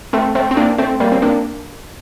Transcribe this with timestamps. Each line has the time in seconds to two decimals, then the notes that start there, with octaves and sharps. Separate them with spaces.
0.13 A3 C4
0.35 A3 C4
0.51 C4
0.57 A#3 D4
0.78 A3 C4
1.00 G3 A#3
1.12 C4
1.22 A#3 D4